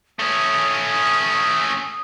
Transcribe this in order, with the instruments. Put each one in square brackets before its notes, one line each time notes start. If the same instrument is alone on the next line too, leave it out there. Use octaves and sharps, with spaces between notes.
[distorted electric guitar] A3 C#4 [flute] D#6